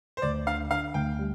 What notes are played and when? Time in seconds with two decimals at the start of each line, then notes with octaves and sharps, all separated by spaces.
0.17 C5
0.22 D2 D5
0.47 D3 F5
0.71 D3 F5
0.94 D2 G5
1.19 G3